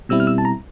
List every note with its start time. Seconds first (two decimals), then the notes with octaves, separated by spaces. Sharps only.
0.09 B2 G3 C4 E4 E6
0.20 F6
0.27 E6
0.38 A5
0.45 A#5